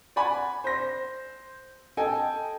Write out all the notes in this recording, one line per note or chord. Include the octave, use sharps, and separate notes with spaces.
D5 F#5 G#5 B5
C5 A#6
A4 D#5 G5 G#5